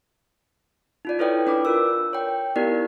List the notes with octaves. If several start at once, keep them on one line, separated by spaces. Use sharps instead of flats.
D#4 F4 D5
E4 A4 B4 C#5 D5 G5
D4 B4 D6
F4 A#4 E6
C#5 G5
B3 D#4 E4 G4 A#4 D5